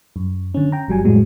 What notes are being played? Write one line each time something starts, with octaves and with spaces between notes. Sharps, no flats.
F#2
D3 C#4
G5 A#5
G1 F#3 G3 G#5
F2 A2 F#3 G#3